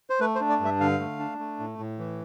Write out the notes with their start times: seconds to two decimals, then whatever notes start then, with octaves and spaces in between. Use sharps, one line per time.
0.10 C5
0.20 A3 B4
0.35 C5
0.40 D4
0.49 D5
0.60 G2
0.65 E5
0.80 D3 F5
1.00 A3
1.19 D4
1.39 A3
1.60 A2
1.79 A2
1.99 E3